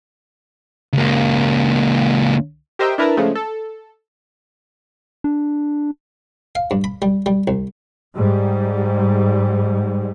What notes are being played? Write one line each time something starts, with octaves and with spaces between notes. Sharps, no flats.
C#2 A#3
G4 A#4 C5 D#5 E5 G5
D4 E4 A#4 B4 A5 A#5
C#3 F3 G#3 A3
A4
D4
F5
G2
B5
G3
G3
C2
G#2 G3